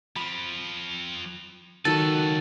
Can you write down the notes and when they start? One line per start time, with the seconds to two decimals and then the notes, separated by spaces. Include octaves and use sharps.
0.16 F3 C4 B5
1.85 C#2 D#3 F#3 F#4 A4 B4 A6